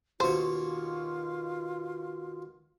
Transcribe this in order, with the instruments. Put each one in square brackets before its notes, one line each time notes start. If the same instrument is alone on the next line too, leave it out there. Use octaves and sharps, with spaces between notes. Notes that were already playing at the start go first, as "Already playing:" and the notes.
[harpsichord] D#2 B2 C#5 [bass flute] F4 [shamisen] C5